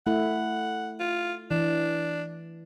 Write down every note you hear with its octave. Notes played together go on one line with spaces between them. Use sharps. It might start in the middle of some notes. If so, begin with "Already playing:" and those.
A3 E4 F#5
F4
E3 D4